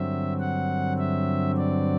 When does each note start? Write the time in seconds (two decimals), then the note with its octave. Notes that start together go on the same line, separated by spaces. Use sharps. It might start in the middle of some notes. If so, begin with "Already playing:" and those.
Already playing: G2 D3 F#3 C4 E5
0.39 F#5
0.98 E5
1.57 D5